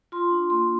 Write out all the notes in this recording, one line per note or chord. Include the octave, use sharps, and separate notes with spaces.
F4 C6
D4
A#3 C6